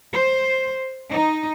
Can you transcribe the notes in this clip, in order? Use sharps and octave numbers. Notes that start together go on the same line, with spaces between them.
C5
D#4